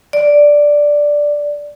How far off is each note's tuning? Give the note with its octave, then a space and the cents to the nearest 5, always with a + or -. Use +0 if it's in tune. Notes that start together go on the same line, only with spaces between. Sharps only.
D5 +0